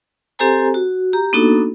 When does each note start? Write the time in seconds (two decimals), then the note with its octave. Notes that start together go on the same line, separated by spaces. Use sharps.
0.39 C4 G4 A4 C5 G#5 A#5
0.74 F#4
1.13 G4 A#5
1.33 A#3 B3 D4 D#4 F#4 A4